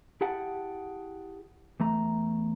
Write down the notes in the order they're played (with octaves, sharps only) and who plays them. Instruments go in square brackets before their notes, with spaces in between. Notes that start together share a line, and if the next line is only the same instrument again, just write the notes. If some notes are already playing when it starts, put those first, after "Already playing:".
[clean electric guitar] E4 G4 G#4 F#5 G5 A5
E2 A3 A#5